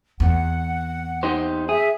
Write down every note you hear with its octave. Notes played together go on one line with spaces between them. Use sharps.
E2 C4 F#5
D#4 G4 C5
G#4 E5